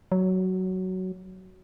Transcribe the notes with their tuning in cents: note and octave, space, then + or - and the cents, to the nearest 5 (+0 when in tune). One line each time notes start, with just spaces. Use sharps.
F#3 +10